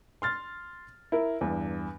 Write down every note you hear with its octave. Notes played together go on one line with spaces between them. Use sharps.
C6 F6 A6
E4 A#4
E2 G2